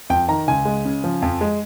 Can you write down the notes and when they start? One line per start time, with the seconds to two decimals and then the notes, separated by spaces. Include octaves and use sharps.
0.10 F2 G5
0.28 D#3 A#5
0.48 C#2 G#5
0.65 G#3
0.85 C#3
1.04 F3
1.22 F2
1.41 G#3